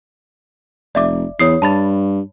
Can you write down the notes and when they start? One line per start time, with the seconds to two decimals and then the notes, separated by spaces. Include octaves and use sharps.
0.95 F1 D5 E5 D6
1.40 E2 C#5 D#6 C7
1.62 G2 A5 B5 A6